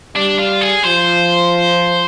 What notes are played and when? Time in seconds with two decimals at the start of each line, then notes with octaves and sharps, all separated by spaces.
0.15 G3 D4
0.39 F4
0.61 G#4
0.83 F3 C5